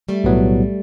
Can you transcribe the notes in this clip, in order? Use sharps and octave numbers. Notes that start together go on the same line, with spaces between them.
G3 A3
B1 A2 F#3 B3